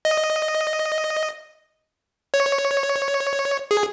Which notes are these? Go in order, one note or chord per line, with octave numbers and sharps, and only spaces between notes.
D#5
C#5
G#4